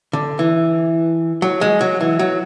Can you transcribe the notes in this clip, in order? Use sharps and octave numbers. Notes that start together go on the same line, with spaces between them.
D3
E3
F#3
G#3
F#3
E3
F#3